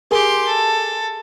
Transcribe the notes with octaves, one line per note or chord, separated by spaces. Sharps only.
G4 G#4 A#4 G#5 C6
A4